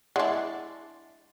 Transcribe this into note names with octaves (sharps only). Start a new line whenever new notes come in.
G#3 D4 E4 D5 F#5 C6